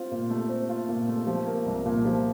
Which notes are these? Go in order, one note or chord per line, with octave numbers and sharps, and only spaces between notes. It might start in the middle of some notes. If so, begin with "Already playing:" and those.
Already playing: C4 F4
A#2
A3
C4
F4
A#2
A3
F3
A#3
C2
A#2
F3